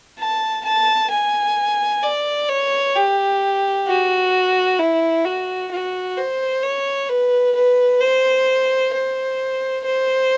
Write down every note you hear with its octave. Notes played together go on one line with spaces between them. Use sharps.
A5
A5
G#5
D5
C#5
G4
F#4
E4
F#4
F#4
C5
C#5
B4
B4
C5
C5
C5